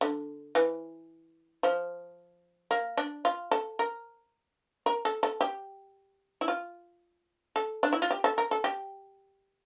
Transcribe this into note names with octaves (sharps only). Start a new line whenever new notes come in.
D3
E3
F3
A#3
D4
F4
A4
A#4
A#4
A4
A4
G4
E4
F4
A4
D4
E4
F4
G4
A4
A#4
A4
G4